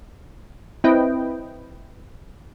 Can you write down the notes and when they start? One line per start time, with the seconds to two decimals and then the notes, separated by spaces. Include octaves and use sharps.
0.84 C4 E4 B4 D#5 G5